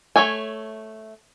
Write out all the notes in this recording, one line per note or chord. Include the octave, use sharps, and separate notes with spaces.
A3 C#5 E5 G#5